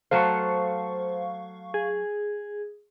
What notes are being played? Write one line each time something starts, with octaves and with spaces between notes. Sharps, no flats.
F#3 A3 A4 C5 F5 C#6
G#4